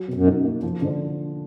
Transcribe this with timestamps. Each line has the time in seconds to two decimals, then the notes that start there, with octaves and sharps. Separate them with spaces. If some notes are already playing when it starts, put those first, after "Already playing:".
Already playing: F#3 F#4
0.08 B2
0.14 F#2
0.26 D#4
0.44 A#3
0.63 F#2 F3
0.82 G#2 D3